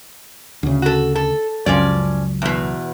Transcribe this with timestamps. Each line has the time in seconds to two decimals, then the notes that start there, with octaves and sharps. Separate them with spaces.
0.63 D2 C#3
0.82 F#4 A4
1.15 A4
1.66 C#2 F#2 F3 C#4 D5
2.42 E2 B2